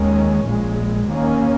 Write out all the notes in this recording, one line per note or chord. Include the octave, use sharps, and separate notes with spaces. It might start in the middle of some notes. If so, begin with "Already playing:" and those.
Already playing: D#2 D#3 G#3 C#4
A#1 A#2 G#3
D#2 D#3 A#3 C#4